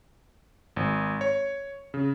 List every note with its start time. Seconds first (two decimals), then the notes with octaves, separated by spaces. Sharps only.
0.76 G#1
1.21 C#5
1.94 C#3